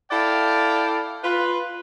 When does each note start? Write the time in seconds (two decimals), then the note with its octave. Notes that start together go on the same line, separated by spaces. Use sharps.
0.11 E4 A4 D5 F5 G5
1.24 F4 B4